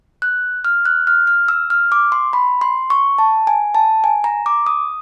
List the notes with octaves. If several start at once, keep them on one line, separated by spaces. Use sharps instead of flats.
F#6
F6
F#6
F6
F6
E6
F6
D6
C6
B5
C6
C#6
A5
G#5
A5
G#5
A#5
D6
D#6